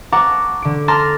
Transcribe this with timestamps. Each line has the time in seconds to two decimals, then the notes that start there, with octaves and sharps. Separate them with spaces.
0.12 F#5 A5 A#5 C#6 D6
0.62 D3 D7
0.88 A5 A#5 C6 D6 F6 A#6